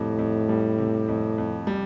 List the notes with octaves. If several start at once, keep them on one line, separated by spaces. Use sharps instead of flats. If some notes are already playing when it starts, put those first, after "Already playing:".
Already playing: F2 A2 C3 G3
F2
G3
C3
F2
F2
G3